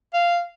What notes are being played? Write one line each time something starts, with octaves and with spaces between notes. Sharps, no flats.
F5